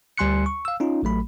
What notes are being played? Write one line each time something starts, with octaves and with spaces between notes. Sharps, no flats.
D2 G3 G#5 C6 F#6 C#7
C#6
F5 E6
C#4 D#4 F4
A1 F#3 A3 B5